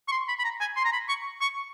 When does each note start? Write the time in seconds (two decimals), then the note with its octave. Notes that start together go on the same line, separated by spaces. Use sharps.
0.08 C#6
0.12 C6
0.28 B5
0.39 B5
0.44 A#5
0.61 G#5
0.76 C6
0.85 A#5
0.93 B5
1.08 C#6
1.41 C#6